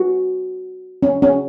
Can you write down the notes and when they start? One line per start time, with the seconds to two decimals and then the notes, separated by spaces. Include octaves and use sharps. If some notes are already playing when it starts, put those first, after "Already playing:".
Already playing: F#4
1.03 C#4
1.22 C#4